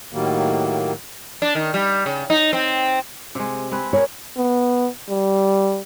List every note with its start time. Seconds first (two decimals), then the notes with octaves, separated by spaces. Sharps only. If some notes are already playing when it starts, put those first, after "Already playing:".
0.13 A2 D#3 F#3 G3 A#3
1.42 D4
1.55 D#3
1.74 G3
2.06 C#3
2.30 D#4
2.53 C4
3.35 C3 G#3
3.71 G#3 C4 B4
3.93 B2 G#4 A#4 C#5
4.37 B3
5.09 G3